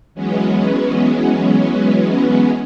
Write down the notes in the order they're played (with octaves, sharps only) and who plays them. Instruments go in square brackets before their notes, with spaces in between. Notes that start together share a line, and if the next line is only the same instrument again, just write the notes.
[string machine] E3 F#3 G#3 B3 C#4